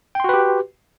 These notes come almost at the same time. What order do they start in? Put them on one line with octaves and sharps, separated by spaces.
G5 C6 F#4 B4 G4